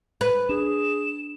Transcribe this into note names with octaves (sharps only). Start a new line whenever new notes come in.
B4
D4 G#4 E7